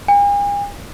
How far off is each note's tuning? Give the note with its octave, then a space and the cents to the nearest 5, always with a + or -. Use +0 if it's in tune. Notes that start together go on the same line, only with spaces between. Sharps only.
G#5 -45